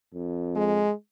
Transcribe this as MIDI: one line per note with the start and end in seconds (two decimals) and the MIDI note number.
0.14 0.86 41
0.56 0.92 56